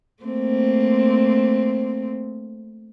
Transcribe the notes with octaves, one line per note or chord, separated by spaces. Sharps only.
A3 A#3 C4